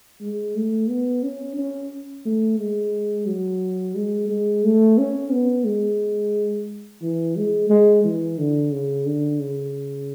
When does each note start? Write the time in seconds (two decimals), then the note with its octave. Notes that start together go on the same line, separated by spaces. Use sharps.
0.21 G#3
0.55 A3
0.89 B3
1.23 C#4
1.57 C#4
2.25 A3
2.59 G#3
3.27 F#3
3.95 G#3
4.29 G#3
4.64 A3
4.98 C#4
5.32 B3
5.66 G#3
7.02 E3
7.36 G#3
7.70 G#3
8.04 E3
8.38 D3
8.72 C#3
9.06 D3
9.40 C#3